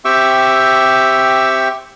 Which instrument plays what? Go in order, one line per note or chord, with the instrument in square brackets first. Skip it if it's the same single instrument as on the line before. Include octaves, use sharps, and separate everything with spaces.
[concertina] C4 G4 E5 G5 C#6 E6